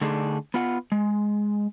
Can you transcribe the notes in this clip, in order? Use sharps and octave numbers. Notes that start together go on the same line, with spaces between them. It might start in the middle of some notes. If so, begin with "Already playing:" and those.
D3 A3 D4 D#4 G#4
B3 F4 F#5
G#3